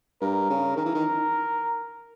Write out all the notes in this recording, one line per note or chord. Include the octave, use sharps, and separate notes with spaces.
G2 A#4
C#3
D#3 A#4
E3
D#3